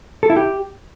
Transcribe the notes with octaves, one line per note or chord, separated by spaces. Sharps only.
A4
E4
G4